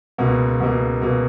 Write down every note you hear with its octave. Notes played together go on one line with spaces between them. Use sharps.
C#2 B2 A#3
C#2 B2 A#3
B2 A#3